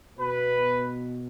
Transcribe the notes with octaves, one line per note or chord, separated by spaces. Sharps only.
B2 B4